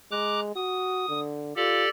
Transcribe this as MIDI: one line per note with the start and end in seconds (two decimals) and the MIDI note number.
0.11 0.54 56
0.11 0.40 82
0.11 0.40 86
0.11 0.40 90
0.56 1.06 66
0.56 1.19 87
1.09 1.56 50
1.56 1.85 65
1.56 1.89 67
1.56 1.89 69
1.56 1.89 74